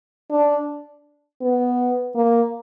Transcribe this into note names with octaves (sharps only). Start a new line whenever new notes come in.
D4
B3
A#3